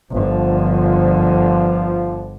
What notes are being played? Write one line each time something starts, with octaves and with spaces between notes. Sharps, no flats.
G1 D3 F3